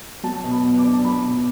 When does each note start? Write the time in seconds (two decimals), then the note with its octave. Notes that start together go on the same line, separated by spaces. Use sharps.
0.23 F#3 A5
0.44 B2
0.51 B5
0.64 B3
0.78 D6
0.84 D4
0.93 A5
1.05 F#3 B5
1.24 B2